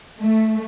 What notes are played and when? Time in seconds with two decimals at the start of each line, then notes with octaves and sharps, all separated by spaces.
0.21 A3